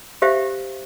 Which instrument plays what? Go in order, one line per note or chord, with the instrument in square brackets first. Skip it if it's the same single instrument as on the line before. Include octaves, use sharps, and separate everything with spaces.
[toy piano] G4 C5 E5 F5